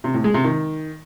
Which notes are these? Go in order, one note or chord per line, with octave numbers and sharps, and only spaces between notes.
C3
A2
G#3
C3
D#3